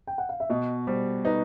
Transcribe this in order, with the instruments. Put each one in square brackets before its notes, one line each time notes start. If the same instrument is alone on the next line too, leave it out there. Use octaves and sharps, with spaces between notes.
[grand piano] G5
F#5
F5
E5
[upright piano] B2 [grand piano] D#5
[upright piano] G3 [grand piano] C5
[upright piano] D#4 [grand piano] B4